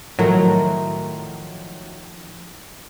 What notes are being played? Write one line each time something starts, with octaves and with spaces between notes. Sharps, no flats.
A2 D#3 F3 F#3 A3 A#4